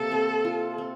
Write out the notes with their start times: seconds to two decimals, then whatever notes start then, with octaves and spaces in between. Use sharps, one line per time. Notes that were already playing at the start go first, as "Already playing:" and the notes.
Already playing: C3 A#3 A4
0.11 C4
0.45 F4
0.78 C4